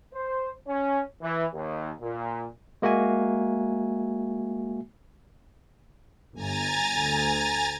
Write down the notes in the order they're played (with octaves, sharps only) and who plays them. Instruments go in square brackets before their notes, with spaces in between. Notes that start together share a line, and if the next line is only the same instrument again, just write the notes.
[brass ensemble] C5
C#4
E3
D#2
A#2
[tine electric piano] G#3 A#3 F#4 E5 G#5
[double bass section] G1 [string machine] G#5 A#5 A6
[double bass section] D2